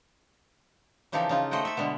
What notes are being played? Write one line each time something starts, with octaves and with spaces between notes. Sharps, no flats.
C#3 E3 F3 D#4 G4 A4
C#3 D#4 F4
A3 C5 D#5 F#5 G5
A4 E5
B2 D3 G#3 B3